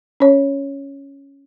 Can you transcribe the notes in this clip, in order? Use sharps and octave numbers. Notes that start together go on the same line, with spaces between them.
C#4 C#5